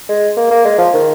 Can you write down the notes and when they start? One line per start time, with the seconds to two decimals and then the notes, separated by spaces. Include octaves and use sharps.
0.09 G#3
0.37 A#3
0.51 A#3
0.65 G#3
0.78 F3
0.94 D#3